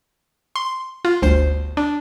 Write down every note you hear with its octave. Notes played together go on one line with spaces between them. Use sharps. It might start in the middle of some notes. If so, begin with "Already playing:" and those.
C6
F4
G1 D2 C5 C7
D4